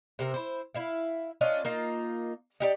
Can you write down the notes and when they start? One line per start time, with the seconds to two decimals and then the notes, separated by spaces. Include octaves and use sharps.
0.19 C3 C4 A#4
0.34 E4 C5
0.75 E4 E5 F5
1.41 C#4 D4 F4 D#5
1.65 A#3 D#4 F4
2.60 D#4 G4 D5